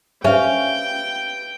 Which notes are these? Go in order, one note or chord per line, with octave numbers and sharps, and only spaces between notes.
C#4 G4 B4 E5 F5 G5